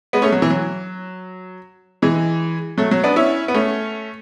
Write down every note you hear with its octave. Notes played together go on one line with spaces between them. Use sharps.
G#3 B3
A3 C#4
F#3
E3
F#3
E3 G#3
F#3 A3
F#3
B3 D4
C#4 E4
B3
A3 C#4